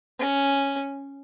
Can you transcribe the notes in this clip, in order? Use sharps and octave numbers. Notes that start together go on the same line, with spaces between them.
C#4